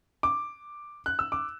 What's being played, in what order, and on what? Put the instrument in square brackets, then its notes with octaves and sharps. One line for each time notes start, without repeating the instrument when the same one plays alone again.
[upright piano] D6
F#6
E6
D6